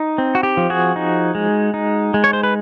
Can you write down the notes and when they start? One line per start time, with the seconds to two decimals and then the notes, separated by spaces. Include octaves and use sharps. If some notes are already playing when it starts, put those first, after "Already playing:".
Already playing: D#4
0.18 C4
0.35 F#4
0.43 G4
0.57 F3
0.70 F#4 G#4
0.96 D#4
1.35 G#3
1.74 D#4
2.14 G#3
2.24 C#5
2.33 C5
2.43 B4